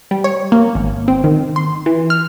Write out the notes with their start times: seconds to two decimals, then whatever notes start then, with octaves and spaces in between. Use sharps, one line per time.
0.11 G3
0.24 C#5
0.52 A#3
0.75 G#1
1.08 C4
1.24 D#3
1.56 C6
1.86 E3
2.10 F6